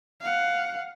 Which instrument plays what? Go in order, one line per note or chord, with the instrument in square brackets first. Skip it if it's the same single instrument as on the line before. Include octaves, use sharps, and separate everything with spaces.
[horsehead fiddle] F5 F#5